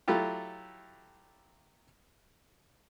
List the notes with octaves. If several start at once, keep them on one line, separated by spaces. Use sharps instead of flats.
F#3 A3 E4 F4 G4